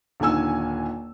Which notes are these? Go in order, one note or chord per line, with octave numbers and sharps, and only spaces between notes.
D#1 D3 D#3 G#5 E6